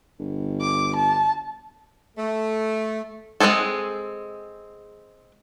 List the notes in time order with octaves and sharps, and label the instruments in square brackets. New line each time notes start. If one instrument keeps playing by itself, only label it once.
[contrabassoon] G1
[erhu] D6
A5
[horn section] A3
[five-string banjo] G#3 A#3 C4 G#4 A4